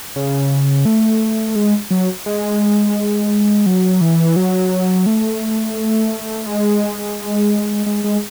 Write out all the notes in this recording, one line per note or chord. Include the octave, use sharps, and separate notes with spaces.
C#3
A3
G#3
F#3
G#3
F#3
E3
F#3
A3
G#3
G#3
G#3